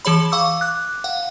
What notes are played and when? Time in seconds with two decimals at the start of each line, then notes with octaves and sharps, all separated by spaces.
0.05 E3 G#4 C#5 B5
0.32 F5 C#6 D6 E6
0.61 D6 F#6
1.04 F5 F#5